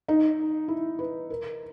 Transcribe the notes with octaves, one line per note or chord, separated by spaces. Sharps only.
D#4
E4
B4
A#4